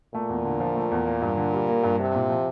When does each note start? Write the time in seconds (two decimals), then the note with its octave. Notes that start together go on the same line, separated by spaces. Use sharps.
0.14 A#2 A3
0.29 E2
0.45 D3
0.60 F3
0.76 A3
0.92 E2
1.07 A#3
1.22 G2
1.38 D3
1.53 G3
1.68 A#3
1.84 G2
1.99 C3 D4
2.15 A#2
2.30 F3